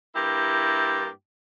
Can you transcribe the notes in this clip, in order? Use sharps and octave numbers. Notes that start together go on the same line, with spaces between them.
G2 A#3 E4 G4